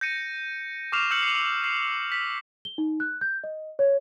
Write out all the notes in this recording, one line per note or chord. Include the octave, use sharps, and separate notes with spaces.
G6 A#6 C#7 D#7
C#6 D6 F6 C7 E7 F7
E6 F6 G6 C#7 F#7
C7 C#7
C7
B6
G7
D#4
F#6
G6
D#5
C#5